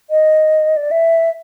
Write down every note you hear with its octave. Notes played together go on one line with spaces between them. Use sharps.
D#5
D5
E5